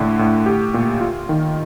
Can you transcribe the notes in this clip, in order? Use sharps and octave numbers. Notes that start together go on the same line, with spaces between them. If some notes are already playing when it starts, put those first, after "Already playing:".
Already playing: A2 D3
A2
G4
A#2
F4
D#3